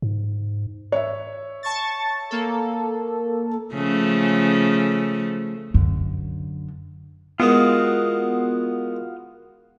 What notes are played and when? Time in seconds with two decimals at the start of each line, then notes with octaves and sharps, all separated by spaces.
0.02 G#2
0.92 C#5 E5
1.63 A5 C#6 A6
2.31 A#3 A4
3.74 C#3 F3 A3
5.74 F#2 D3
7.40 E3 G#3 A#3 B3 F4 F#4 D#6